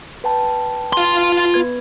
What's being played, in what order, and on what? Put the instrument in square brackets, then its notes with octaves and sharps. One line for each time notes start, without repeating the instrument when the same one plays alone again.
[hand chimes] B4 G5 A5
[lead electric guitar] F4 C6
[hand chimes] B3 B4 G#6